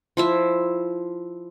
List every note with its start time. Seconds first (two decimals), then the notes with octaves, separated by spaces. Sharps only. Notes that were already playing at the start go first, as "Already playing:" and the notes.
0.17 F3 E4 E5